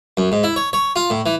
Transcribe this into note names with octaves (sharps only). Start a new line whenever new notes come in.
F#2
G#2
E4
C#5
C#5
F4
A2
E3